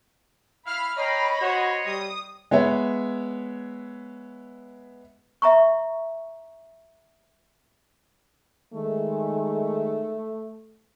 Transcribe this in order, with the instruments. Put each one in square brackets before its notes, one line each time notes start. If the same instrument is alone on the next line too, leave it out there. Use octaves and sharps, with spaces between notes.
[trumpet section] E4 F5 [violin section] B5 [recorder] F6
[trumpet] C#5 [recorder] D#5 [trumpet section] F5 G5 A#5 [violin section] B5
[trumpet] F#4 [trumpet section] C5 C#5
[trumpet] G3 [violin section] D#6
[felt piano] G#3 B3 C#5 E5
[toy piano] E5 A#5 C#6
[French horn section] D#3 G#3 [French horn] A3